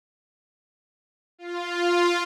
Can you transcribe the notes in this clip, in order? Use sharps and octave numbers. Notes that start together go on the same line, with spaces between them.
F4